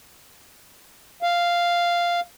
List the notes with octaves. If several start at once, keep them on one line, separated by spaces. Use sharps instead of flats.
F5